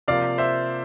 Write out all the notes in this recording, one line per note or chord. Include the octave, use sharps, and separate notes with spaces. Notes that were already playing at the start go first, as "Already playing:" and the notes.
C3 F3 A#3 D5 F5
C5 E5